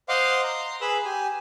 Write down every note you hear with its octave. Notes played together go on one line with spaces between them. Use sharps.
C5 D#5 F5 F#5 C6 D6
A#5 C6
G#4 B4 B5 E6
G4 G#5